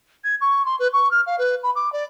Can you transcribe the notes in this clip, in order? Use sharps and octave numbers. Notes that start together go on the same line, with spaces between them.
G#6
C#6
C6
B4
C#6
F6
F5
B4
B5
D6
D5